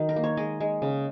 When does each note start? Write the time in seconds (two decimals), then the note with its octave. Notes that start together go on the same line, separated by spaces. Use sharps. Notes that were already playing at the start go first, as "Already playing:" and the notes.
Already playing: D#3 F#3 D#4
0.09 A#4
0.16 A#3
0.24 C#5
0.37 G#3 D#5
0.60 G#3
0.82 C#3